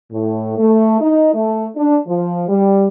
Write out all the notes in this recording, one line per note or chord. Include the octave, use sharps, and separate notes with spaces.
A2
A3
D#4
A3
D4
F3
G3